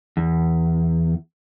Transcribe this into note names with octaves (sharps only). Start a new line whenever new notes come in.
E2